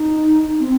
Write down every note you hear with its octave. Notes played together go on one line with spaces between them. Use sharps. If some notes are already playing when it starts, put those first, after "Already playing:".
Already playing: D#4
C4